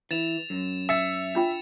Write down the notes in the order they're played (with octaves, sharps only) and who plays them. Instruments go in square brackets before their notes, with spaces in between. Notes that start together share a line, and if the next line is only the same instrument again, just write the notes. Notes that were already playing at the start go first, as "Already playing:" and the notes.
[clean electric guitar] E3 [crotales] A6 E7 F7
[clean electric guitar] F#2
[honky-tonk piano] E5 [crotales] A6 C#7 E7
[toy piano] D4 F4 G5